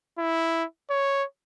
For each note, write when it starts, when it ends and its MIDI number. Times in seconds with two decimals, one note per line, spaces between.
0.18 0.64 64
0.90 1.24 73